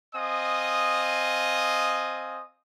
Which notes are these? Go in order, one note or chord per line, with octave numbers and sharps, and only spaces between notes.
C4 D#5 F5 G#5 D#6